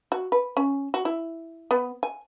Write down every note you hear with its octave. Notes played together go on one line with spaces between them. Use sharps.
F#4
B4
C#4
F#4
E4
B3
G#5